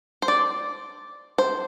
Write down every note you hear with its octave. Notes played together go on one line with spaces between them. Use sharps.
C5
D5
C5